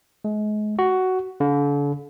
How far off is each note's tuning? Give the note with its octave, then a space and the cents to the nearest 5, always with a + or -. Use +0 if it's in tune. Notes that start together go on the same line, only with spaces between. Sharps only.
G#3 +35
F#4 +10
D3 -40